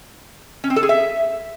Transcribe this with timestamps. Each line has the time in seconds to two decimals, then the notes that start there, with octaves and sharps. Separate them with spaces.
0.64 C#4
0.70 C4
0.76 A4
0.83 G#4
0.89 E5